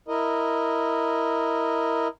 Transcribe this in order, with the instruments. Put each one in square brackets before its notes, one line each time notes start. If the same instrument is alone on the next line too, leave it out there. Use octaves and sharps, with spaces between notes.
[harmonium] E4 A#4 D#5